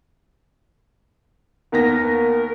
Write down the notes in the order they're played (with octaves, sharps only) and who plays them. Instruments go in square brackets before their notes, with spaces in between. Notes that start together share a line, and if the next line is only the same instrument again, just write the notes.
[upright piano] D#2 B3 A#6 [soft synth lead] A#4